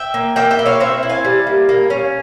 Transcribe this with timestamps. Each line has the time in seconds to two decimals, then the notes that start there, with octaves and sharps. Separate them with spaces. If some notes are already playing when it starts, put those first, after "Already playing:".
Already playing: E5 G5
0.14 A#3
0.36 A#3 E5 G5
0.51 E5 G5
0.59 E4
0.66 C#5 F5
0.80 C4 C5 E5
1.03 E4
1.09 F5 G#5
1.25 G3
1.47 A#3
1.69 A#3
1.90 C#4